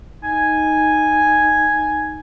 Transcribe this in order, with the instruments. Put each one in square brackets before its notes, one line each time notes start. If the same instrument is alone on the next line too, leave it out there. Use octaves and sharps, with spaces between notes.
[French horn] D#4 [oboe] G#5